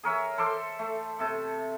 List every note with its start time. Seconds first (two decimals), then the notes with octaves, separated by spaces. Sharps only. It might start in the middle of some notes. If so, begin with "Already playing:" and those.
0.03 G#4 A#4 C#5 E5
0.38 A4 C5 C6 D6
0.79 A3
1.19 C3 A4